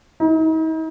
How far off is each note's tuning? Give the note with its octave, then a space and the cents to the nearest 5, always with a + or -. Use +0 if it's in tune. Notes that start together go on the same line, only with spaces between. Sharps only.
D#4 +40